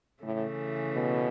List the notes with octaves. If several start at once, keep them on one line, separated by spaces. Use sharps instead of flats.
A2 C#3 E3 A3
B2